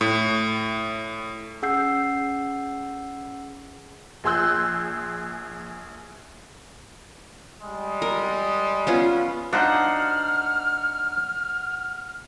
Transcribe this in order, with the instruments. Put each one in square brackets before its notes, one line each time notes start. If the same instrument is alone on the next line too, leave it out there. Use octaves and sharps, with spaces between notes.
[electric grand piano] A2
[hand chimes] C#4 G#4 F#5 E6 G6 C7
[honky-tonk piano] A#1 G#4 C6 E6 F#6 G6
[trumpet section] G3 G#3
[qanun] A#4
B3 C#4 F4
[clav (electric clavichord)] D4 D#4 C5 [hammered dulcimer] F#5 [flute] F6